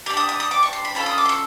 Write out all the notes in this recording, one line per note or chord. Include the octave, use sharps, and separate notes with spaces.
D4 G4 D6
D#6
D#6
D#6
D6
C#6
C6
B5
C#4 F4 A4 B5
D#6
D6
C6
C#6